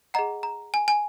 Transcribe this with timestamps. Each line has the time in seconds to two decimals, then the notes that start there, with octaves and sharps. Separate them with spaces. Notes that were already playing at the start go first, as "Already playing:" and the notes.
0.14 G#4 D#5 F#5 A#5
0.43 A#5
0.74 G#5
0.88 G#5